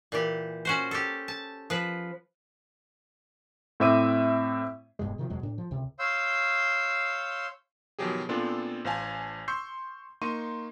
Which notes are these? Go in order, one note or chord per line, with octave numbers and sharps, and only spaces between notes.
A#2 E3 G4
C#4 F#4 C5
G4 A4
A5
F3 B4
A2 C4 E5 D6 D#7
D1 G2 B2 G#3
C3 D#3 F3 F#3
E2 B2 F#3 G#3
A2 D4
F3
C#2 C3
C#5 F5 C6 E6 G6
B2 D#3 F3 F#3 G4 G#4
A#2 B3 C4 D4 F4 A4
A1 C5 F5 G#5 A5
C6 C#6 E6 G6 C7
A#3 D#4 C6 C#6 D#7